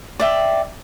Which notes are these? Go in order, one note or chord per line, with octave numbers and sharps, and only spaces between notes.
D5 E5 G5